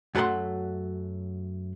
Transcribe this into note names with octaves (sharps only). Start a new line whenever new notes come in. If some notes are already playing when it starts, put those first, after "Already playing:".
F#2 F#3 A3 A4 F#5 C6